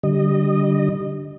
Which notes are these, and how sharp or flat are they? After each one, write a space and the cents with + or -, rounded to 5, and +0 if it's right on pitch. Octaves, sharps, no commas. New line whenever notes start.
D3 -5 G3 -10 D#5 -20